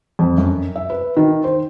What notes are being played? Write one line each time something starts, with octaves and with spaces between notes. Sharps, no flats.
F2
F#2
E5
B4
D#3
C5